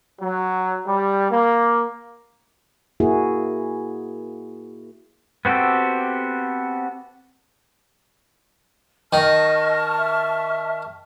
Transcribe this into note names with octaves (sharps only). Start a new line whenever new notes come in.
F#3
G3
A#3
A#3 E4 F#4 G#4
B3 C4 F#4 G4 A4
D#3 D#5 A5 C#6 F6
E5